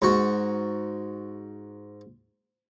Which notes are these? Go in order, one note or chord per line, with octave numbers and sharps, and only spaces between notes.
G#2 F#4